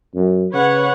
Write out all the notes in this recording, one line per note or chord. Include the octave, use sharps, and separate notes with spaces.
F#2
C#3 B4 C#5 F#5